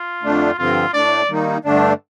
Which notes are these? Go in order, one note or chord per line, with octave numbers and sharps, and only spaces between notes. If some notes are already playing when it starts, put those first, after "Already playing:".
Already playing: F4
F2 D3 A3 D4
G2 D3 F3 C4 F4
A2 A3 D4 D5
D#3 G3 A#3 D#4
G2 D3 A3 D4